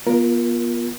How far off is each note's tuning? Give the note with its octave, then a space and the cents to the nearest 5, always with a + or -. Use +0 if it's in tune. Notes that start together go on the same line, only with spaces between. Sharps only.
B3 -40 F4 +0 A#4 +15